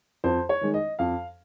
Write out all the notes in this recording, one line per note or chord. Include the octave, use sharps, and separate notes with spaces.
F2 C5
C#5
D#3 G#3
D#5
F2 F5